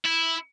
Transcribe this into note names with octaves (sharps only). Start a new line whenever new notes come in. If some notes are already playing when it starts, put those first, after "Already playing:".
E4